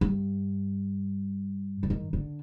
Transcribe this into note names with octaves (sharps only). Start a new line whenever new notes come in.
G2
D3
D#3
D3